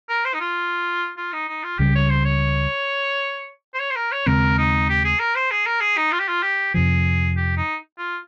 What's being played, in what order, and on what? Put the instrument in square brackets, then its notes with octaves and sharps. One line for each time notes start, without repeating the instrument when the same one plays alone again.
[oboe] A#4
C5
D#4
F4
F4
D#4
D#4
F4
[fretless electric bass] C#2 C#3 G3 [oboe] G4
[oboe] C#5
C5
C#5
C5
C#5
C5
A#4
C#5
[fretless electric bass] D#2 C#3 G#3 C4 [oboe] A#4
[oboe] D#4
G4
G#4
A#4
C5
G#4
A#4
G#4
D#4
F4
G4
F4
G4
[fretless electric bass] F2 C3 F3 [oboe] G#4
[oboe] G4
D#4
F4